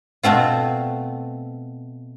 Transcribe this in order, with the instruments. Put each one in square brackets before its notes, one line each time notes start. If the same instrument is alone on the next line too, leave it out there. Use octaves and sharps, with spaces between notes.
[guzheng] B2 A3 C4 F4